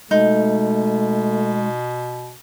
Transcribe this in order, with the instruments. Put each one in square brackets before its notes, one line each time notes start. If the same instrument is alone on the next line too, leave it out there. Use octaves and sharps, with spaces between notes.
[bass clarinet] B2 [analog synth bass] G#3 [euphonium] A3 [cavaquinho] D#4